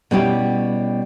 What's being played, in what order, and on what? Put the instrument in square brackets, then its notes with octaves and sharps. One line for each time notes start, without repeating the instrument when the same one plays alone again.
[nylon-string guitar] B2 G3 C#4 E4 G4